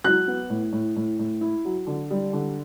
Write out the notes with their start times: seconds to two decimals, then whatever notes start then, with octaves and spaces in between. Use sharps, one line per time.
0.04 F#3 F#6
0.28 B3
0.50 A2
0.72 A2
0.96 A2
1.19 A2
1.41 E4
1.65 F#3
1.87 D3
2.10 G3
2.33 D3